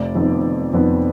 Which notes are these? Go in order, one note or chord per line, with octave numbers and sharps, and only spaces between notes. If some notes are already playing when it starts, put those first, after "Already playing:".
Already playing: F1 D5
F2 D#3 B3
F1
F2 D#3 B3